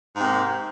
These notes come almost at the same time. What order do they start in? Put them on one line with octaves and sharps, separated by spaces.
G#2 C3 A#3